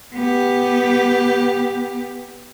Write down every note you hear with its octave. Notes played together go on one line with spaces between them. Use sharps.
B3 G4